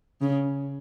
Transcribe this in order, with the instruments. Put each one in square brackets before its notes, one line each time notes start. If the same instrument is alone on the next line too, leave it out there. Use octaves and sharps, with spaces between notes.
[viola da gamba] C#3